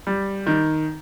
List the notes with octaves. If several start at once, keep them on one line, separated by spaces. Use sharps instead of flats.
G3
D#3